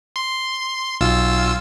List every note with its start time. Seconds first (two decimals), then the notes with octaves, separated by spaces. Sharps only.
0.16 C6
1.01 B1 F4 E6